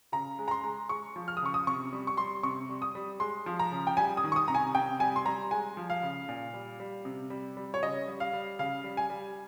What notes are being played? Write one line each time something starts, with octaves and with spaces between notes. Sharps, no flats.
C#3 A#5
G#3
A#5
C6
G#3
G#3 C#6
F3
F6
D#6
C#3 C#6
D#6
C3 C#6
G3
C#6
G3 C6
C3 C#6
G3
D#6
G3
G#3 C6
F3
A#5
C#3
G5
G3 G#5
D#6
D#3
C#6
D#6
C3 A#5
G#5
C3 G5
G3 G#5
C6
G3 A#5
G#3 G#5
F3
F5
C#3
A#2
G3
G3
C3
G3
G3
C#5
C#3 D#5
G3
F5
G3
C#3 F5
G3
G#5
G3